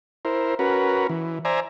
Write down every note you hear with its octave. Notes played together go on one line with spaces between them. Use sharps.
E4 A#4 C5
C#4 F#4 A#4 B4
E3
C5 D5 E5 G#5 A#5